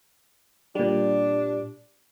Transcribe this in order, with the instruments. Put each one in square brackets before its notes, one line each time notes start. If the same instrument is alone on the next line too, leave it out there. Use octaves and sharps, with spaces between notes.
[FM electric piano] A#2 G3 [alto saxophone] D4